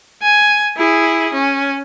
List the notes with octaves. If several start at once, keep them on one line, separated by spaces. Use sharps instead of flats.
G#5
E4 G#4
C#4